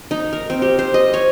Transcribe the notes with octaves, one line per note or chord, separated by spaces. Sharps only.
D#4
A#4
C4
G4
C5
D#5
C#5